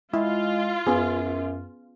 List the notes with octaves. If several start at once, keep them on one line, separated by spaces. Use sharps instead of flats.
G#3 E4 F4
F#2 B3 C#4 G#4